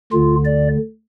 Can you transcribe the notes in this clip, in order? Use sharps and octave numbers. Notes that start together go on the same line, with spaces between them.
D2 D3 F4
D5